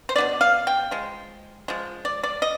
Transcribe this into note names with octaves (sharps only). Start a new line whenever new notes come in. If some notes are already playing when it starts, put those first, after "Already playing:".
C5
B2 B3 D4 D5
F5
G5
F3 G#3
F3 G#3
D5
D5
D#5